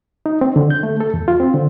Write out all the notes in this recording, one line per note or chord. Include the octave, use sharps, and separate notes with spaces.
D#4
C4
D3
G6
A3
A4
E2
F4
C4
D3